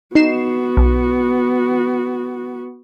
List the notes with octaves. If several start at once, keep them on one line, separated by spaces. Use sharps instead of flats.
B3 D#4 F#4 C7 E7
B1